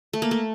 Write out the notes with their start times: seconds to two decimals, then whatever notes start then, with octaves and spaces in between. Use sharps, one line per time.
0.13 A3
0.22 A#3
0.31 A3